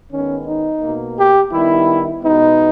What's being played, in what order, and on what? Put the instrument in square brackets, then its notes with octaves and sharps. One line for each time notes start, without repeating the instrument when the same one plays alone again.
[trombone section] D#3 G#3 B3 C#4
D#4
B2 A#3
G4
D#3 G3 B3 E4
B2 G#3 B3 D#4